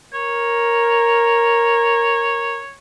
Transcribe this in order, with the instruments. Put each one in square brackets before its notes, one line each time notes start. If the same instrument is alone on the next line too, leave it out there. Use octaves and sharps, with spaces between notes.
[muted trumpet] A#4 [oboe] C#5